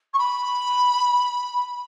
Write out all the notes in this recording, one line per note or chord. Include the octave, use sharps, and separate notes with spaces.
C#6
B5